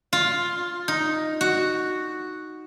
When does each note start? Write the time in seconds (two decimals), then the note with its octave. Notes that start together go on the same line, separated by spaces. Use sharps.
0.13 F4
0.88 D#4
1.41 F#4